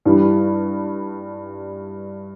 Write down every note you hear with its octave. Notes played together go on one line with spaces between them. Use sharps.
G2 E3 G3